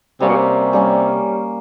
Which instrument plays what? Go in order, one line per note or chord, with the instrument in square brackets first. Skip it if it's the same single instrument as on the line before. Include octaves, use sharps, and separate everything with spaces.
[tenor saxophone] C3 [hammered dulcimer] G3 A#3 C#4
[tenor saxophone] B2
C3
[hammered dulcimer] G3 A#3 C#4